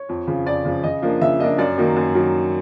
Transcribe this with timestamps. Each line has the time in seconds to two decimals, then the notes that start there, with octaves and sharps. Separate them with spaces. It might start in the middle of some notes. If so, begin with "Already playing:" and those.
Already playing: C#5
0.09 F2
0.27 C#3 F3
0.46 F2 D5
0.65 C#3 F3
0.83 C#3 D#5
1.02 F3 A#3 D4
1.21 C#3 E5
1.39 F3 A#3 D4 D#5
1.58 F#2 D5
1.78 D#3 F#3 A#3
1.96 F#2
2.14 D#3 F#3